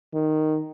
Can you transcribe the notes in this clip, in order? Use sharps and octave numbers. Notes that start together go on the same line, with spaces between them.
D#3